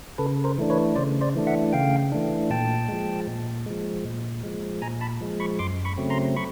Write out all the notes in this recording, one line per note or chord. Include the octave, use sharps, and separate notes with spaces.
C#3 A4 B4
A#4 C5
E3 A3 D4
B4 C#5
C#3 C5 D5
C5 D5
E3 A3 D4
E5 F#5
C#3 F5 G5
E3 A3 D4
A#2 G5 A5
F3 G#3
A#2
F3 G#3
A#2
F3 G#3
A#2 G#5 A#5
A5 B5
F3 G#3
B5 C#6
F#2 C6 D6
B5 C#6
C#3 F#3 A3 C4
A#5 C6
B5 C#6